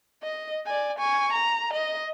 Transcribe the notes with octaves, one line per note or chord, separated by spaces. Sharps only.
D#5
D5 G#5
G#5 C#6
A#5
D#5